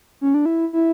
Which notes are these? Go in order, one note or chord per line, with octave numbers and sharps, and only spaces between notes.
C#4
D4
E4
E4